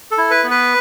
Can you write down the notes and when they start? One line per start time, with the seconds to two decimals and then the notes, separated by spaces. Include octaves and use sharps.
0.11 A4
0.18 E4
0.31 B4
0.44 B3
0.51 B4